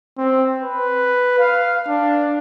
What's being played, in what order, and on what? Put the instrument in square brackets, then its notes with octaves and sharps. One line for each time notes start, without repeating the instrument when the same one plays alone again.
[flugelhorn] C4
B4
F5
D4